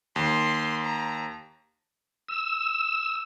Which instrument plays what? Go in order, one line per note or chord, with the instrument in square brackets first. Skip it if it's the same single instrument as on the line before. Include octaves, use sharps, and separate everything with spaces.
[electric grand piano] D#2 [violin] C6
[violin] A#5
[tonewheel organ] E6